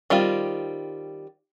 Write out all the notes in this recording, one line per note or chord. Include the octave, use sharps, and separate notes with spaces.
D#3 G3 C4 F4